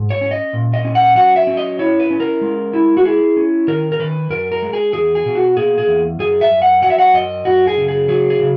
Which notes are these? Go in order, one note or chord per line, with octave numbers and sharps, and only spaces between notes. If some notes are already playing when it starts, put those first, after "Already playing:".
Already playing: G#2
C#5
C#4
D#5
A#2
D#5
C#4
F#5
F#3 F#5
E5
C#4
D#5
E4 C#5
B4
C#4
A#4
G#3
E4
F#4
E4 G#4
C#4
D#3 A#4
A#4
D#3 B4
F#2 A#4
A#4
G#3
G#4
E2 G#4
G#4
B2
F#4
A#3 G#4
G#4
E2
F#2 G#4
E5
F#2
F#5
F#3 F#5
E5
F#5
F#2 D#5
F#2 F#4
G#4
C#3
G#4
F#3 G#4
G#4
C#3